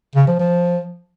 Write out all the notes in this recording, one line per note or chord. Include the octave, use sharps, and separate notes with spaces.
C#3
F3
F3